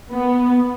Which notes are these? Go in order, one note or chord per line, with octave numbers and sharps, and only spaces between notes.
B3